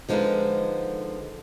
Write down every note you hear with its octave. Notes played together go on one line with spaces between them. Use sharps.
D3 F3 G#3 D#4 B4